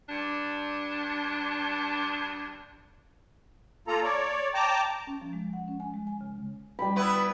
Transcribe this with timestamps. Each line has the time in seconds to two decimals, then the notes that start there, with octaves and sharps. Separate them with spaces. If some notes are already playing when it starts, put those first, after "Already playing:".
0.09 G2 D4
3.88 A#3 F4 A4 A#5
4.03 C#5 D5
4.54 G5 A5 A#5 D6
5.07 C#4
5.21 F3
5.33 G#3
5.53 F#5
5.68 C#4
5.80 G#5
5.94 G#3
6.07 G#5
6.21 C#3
6.79 G3 B5
6.96 B3 E4 B4